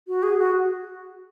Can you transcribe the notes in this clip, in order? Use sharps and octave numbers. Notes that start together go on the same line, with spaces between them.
F#4
G#4
F#4